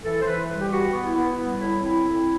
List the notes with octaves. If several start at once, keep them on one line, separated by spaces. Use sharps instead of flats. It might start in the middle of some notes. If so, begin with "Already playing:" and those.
E3 A4
C5
E3 B4
G3
G4
B3 F#4
B3
E4
B3
G3
A2 E4
C4 E4
A2